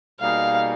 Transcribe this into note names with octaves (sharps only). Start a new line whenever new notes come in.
B2 G3 A#3 D#4 G#4 F5